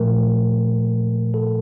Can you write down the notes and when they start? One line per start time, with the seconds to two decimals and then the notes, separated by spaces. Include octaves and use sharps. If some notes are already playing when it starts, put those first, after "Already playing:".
Already playing: A#2 F3 A3 A#4
1.34 A4